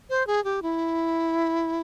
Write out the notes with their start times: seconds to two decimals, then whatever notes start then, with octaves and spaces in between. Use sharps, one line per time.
0.10 C5
0.27 G#4
0.44 G4
0.63 E4